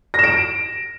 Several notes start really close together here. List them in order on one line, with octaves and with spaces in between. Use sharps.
A#6 E7 D7